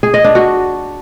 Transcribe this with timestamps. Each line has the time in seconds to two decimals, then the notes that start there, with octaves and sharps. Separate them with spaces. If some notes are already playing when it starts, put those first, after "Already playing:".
0.03 G#4
0.14 D#5
0.24 D4
0.35 F#4